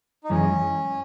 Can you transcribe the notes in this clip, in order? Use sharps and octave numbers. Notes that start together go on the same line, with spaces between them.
D#4
F#2 E3 G#3 C#4